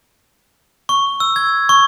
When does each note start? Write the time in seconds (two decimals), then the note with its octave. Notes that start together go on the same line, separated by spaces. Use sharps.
0.89 C#6
1.20 E6
1.36 G#6
1.69 C#6